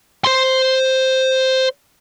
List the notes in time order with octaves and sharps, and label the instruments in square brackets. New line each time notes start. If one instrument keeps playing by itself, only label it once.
[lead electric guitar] C5 C6